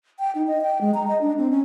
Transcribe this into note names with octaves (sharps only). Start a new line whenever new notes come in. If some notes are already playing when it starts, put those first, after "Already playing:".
G5
D#4
D#5
G5
G#3
A#5
D#5
D4
C4
C#4